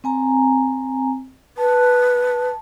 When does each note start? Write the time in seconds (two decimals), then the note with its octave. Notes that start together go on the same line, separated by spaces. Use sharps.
0.04 C4 G#5 A#5
1.58 B4 A5